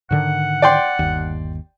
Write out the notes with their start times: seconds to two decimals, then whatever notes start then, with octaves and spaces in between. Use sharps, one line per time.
0.11 G#2 D3 D#3 F#5
0.62 D5 G5 C6
0.99 G1 D#2